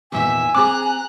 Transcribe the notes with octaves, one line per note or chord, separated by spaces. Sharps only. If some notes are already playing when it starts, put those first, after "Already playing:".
E2 A#2 D#3 E5 G#5
C4 G#4 A#5 D6 F#6